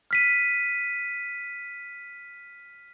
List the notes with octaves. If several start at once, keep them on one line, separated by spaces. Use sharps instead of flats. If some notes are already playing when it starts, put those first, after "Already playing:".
F6 B6 D#7